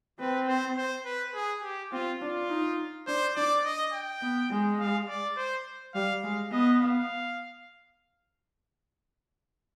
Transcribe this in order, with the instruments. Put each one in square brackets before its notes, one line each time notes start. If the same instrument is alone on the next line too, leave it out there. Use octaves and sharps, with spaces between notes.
[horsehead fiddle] C4 [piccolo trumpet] B4
[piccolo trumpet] C5
C5
B4
G#4
G4
[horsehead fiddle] C4 [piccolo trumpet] F4
[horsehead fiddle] D4 [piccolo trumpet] F4
[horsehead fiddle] D#4
[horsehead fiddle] D4 [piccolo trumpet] C5
[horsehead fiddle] D4 [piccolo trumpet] D5
[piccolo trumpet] D#5
G5
[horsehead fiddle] B3
G#3
[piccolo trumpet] F5
D5
C5
[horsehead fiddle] G3 [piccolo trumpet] F5
[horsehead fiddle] G#3 [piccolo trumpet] F5
[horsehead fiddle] B3 [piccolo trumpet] D#5
[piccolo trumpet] F5